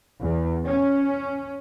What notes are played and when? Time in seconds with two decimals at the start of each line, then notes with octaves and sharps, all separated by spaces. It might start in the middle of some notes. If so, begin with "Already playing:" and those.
0.21 E2
0.65 C#4